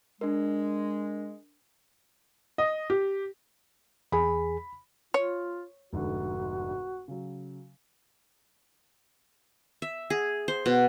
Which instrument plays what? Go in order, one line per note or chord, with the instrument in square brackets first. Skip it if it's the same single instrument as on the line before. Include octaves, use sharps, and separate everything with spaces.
[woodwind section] G#3 [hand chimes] D4 A#4
[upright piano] D#5
G4
[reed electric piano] E2 G#4 [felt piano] B5
[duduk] F4 [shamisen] C#5
[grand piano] F1 G#2 D3 [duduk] F#4
[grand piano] C#3 F#3
[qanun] E5
G#4
C5
B2